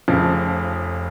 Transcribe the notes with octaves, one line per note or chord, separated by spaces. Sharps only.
F1 F2 C#3 F3